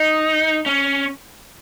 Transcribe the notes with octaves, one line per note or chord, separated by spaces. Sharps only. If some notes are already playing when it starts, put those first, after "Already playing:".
Already playing: D#4
C#4